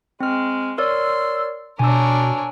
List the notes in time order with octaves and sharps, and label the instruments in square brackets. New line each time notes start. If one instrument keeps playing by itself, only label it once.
[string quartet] G#3 [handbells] C4 F6
[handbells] A#4 C#5 D5 [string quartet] C6 [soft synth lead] E6
[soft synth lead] B2 [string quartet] D4 A#4 C#5 [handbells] G#5 E6